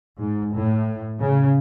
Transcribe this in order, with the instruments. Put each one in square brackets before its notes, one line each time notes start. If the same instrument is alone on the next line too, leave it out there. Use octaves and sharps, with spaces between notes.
[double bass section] G#2
A2
C#3